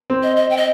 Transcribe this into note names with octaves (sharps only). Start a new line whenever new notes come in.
C4
D#5
D#5
G5
D#5